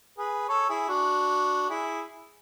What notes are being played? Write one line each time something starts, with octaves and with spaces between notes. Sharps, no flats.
G#4 B4
A4 C#5
E4 G#4
D4 F#4
E4 G#4